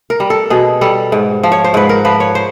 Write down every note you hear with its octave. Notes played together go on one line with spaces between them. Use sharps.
A#4
G3
A4
B2 G#4
G3 A4
G#2
F3
C#5
C5
G#2 B4
A#4
F3 B4
C#5
C5